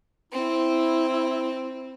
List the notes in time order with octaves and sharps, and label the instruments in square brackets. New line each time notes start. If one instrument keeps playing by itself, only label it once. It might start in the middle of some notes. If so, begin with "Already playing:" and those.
[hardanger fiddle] C4 [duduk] E4